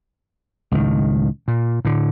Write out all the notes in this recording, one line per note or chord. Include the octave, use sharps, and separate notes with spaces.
C#2 A2 D#3
A#2
A2 D3